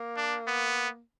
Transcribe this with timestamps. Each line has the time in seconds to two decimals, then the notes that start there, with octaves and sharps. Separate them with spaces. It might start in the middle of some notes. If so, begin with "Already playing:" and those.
Already playing: A#3
0.17 D4
0.47 B3